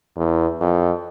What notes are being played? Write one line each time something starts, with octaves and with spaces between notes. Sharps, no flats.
E2
F2